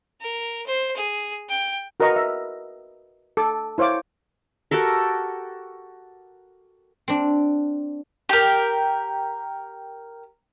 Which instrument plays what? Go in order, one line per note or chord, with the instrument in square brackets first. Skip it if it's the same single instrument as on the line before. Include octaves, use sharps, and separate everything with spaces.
[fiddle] A#4
C5
G#4
G5
[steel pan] F#4 A#4 B4 D#5 A#5 C#6
E5
A4 D6
E4 C5 C#5 F5 D6
[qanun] F#4 G4 A4 A#4
[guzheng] C4 D4
[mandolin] G4 A#4